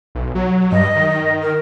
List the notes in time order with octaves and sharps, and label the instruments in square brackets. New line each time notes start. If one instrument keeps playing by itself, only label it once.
[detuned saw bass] B1
F#3
[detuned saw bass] G2 [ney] D#5
[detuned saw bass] D#3
[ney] D#5
A#4